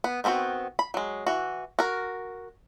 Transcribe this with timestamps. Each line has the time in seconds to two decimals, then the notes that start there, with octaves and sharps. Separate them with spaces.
0.04 B3
0.24 D#3 B3 C4 D4 F#4
0.79 B5
0.94 F#3 G#3
1.27 E3 F#4
1.79 F#4 A#4